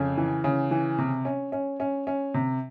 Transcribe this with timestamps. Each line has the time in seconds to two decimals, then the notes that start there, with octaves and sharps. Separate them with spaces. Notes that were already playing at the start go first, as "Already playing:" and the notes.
Already playing: F2 C#3
0.18 E3
0.44 C#3
0.71 E3
0.98 C3
1.25 C#4
1.52 C#4
1.80 C#4
2.07 C#4
2.34 C3